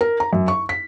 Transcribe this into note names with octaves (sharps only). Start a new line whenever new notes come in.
A#4
A#5
F#2
C#6
B6